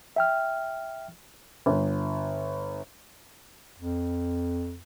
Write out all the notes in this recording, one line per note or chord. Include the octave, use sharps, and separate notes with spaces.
E5 G5 F6
G1
F2